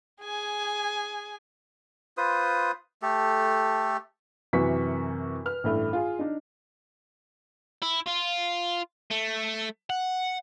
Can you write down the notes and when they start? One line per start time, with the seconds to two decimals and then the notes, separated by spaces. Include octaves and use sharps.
0.21 G#4 G#5
2.17 F4 B4 C5 D#6
3.02 A3 G4 A4
4.53 F#2 C3 E3 F#4 C#6 B6
5.45 B4 F6
5.63 A1 G2 A3 E4
5.93 F4 G#4
6.19 D4 D#4
7.83 E4
8.08 F4
9.11 A3
9.90 F#5